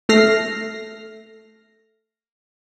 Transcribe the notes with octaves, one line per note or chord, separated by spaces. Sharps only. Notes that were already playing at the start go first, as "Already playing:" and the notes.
A3 F6 A#6 C7